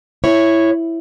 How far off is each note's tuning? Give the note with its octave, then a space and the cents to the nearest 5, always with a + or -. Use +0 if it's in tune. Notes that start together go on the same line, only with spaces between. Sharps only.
E4 +5 C#5 +0